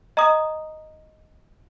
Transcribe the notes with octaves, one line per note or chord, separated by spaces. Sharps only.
D#5 A#5 D#6